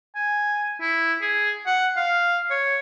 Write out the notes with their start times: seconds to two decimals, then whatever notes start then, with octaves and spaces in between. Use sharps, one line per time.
0.15 G#5
0.81 E4
1.21 G#4
1.66 F#5
1.97 F5
2.50 C#5